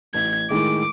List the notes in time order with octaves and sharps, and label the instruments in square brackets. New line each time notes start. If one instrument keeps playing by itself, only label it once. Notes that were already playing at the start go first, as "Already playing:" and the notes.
[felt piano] A1 [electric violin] G#6
[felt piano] A2 D#3 G#3 [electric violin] D6